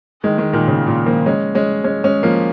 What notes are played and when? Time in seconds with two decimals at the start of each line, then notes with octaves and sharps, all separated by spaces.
0.24 D#3 G#3
0.38 D#3 G#3
0.53 A#2 D#3
0.68 C#3
0.87 A#2
1.06 F3 A#3
1.26 G#3 C#4
1.55 G#3 C#4
1.84 G#3 C#4
2.04 G#3 C#4
2.23 F3 A#3